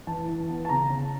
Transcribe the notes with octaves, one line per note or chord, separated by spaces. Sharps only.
E3 A5
E3
B3
A5
C#3 A#5
C#4